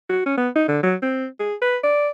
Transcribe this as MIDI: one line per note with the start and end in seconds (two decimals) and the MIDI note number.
0.10 0.23 66
0.26 0.36 61
0.38 0.49 59
0.56 0.64 63
0.68 0.80 50
0.83 0.95 54
1.02 1.27 60
1.40 1.54 68
1.62 1.77 71
1.83 2.09 74